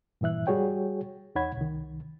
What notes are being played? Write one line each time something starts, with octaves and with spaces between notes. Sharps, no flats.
G2 A#2 E3 E5 F#6
G3 F#4 G#4 C#5 G5
E2 D#4 C#5 F#5 B5 G#6
C2 D#3